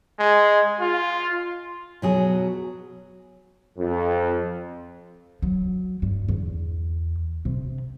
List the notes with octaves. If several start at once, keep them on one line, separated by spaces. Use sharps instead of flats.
G#3
F4
B2 F#3 G#4
F2
F#3
G2
E2
C3